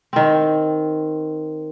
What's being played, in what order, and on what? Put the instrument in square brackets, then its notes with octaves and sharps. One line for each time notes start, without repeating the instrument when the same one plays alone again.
[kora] D#3 C4